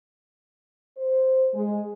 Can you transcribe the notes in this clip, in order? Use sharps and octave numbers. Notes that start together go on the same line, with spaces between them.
C5
G#3